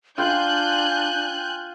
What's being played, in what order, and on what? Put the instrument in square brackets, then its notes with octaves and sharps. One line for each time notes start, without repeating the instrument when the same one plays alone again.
[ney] D4 [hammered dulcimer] F4 G5 C6 [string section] G#5 F#6 G6